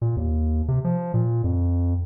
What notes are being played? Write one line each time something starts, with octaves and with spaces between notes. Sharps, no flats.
A#2
D#2
C3
F3
A#2
F2